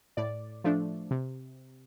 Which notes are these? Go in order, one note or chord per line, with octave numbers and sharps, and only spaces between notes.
A2 D5
F3 A3 D4
C3